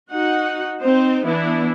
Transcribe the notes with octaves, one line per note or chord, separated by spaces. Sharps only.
D#4 F#4 F#5
C4 D#4 C5
E3 B3 D4 E4